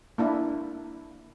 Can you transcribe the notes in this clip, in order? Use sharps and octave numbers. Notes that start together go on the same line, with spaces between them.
A#3 D4 E4